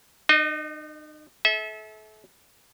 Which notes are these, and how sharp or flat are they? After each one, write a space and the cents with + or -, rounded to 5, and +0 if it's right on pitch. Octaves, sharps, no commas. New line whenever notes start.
D#4 -40 D#5 +5
A4 -35 E5 -25